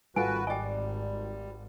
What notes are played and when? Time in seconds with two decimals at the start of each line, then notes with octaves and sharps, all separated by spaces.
0.16 G#1 G3 F4 F#4 A4 B4 G#5
0.47 G3 D5 D#5 G5 G#5